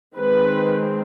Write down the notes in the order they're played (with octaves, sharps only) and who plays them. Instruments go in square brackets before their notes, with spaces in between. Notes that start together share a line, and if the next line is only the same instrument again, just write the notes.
[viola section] D#3 G#3 C4 B4